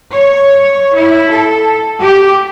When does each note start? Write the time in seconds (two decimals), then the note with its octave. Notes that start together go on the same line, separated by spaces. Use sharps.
0.13 C#5
0.95 E4
1.30 A4
2.00 G4